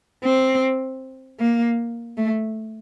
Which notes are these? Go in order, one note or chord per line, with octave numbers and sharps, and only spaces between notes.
C4
A#3
A3